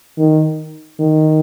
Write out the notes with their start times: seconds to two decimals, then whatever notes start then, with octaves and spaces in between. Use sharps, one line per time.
0.18 D#3
0.99 D#3